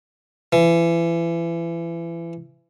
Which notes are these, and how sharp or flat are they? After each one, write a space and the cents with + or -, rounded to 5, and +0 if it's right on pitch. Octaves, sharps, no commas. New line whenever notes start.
E3 +30